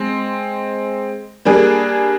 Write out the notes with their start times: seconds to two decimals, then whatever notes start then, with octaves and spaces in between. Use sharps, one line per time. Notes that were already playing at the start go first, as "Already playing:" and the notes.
Already playing: G#3 C4
1.45 G3 A#3 D4 G#4